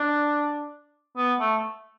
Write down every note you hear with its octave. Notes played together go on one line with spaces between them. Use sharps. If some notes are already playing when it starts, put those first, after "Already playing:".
Already playing: D4
B3
A3